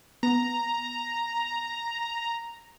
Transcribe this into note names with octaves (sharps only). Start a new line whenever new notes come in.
B3 A#5